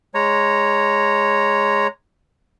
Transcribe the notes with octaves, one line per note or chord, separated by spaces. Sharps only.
G#3 C#5 A#5